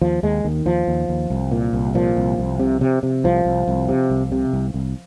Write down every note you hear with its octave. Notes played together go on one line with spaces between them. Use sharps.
D#2 F3
D#2 G#3
D#2 D#3
D#2 F3
D#2
D#2
C2
A#2
C2
A#2 F3
C2
C2
C3
C3
C3
C2 F3
C2
C2
C3
C2
C3
C2
C2